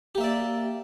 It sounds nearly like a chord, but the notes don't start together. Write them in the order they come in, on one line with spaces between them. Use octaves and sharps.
G4 A#3 E5 D5